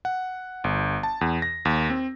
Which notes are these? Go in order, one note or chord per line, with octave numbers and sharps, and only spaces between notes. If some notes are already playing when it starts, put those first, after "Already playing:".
F#5
G1
A5
E2
A#6
D#2
C4